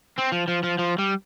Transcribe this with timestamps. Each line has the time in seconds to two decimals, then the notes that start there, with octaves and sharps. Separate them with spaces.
0.18 C4
0.32 F3
0.48 F3
0.63 F3
0.78 F3
0.98 G3